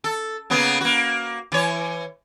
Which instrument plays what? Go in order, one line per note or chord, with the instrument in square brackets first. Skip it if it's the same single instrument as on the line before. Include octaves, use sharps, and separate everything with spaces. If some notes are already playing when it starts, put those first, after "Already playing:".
[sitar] A4
C#3 A#3 B3
A#3 F#4
E3 C#5